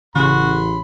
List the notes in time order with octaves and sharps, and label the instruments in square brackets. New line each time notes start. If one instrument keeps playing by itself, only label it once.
[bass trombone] A1 [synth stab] C#3 [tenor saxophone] F#4 [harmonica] B5 C6